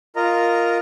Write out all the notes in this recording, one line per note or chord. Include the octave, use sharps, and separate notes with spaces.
F4 A#4 D#5 A#5